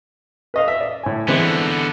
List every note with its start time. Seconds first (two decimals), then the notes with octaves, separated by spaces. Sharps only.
0.54 B4 D#5 F5
0.68 E5
0.81 D5
1.03 A2 G#5
1.28 D3 E3 G#3 B3 C4